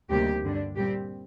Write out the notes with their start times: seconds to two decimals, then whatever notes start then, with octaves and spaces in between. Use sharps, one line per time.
0.10 D2 C3 D#3 G3 A#3 G4
0.43 G2 D3 G3 D4
0.76 A#2 G3 C4 G4